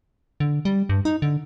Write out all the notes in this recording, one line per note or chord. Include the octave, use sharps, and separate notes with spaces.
D3
G3
G2
D#4
D3